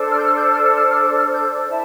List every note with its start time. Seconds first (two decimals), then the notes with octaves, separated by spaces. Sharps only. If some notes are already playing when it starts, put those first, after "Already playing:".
Already playing: D4 A4 C5
0.10 F6
0.16 G6
0.23 F6
0.35 G6
0.49 F6
0.62 F6
0.76 F6
0.88 F6
1.02 D6
1.15 F6
1.33 G6
1.69 E4 A5